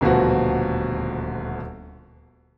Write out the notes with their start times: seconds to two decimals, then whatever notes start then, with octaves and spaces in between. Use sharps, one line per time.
0.01 D#1 D2 B2 F3 F#4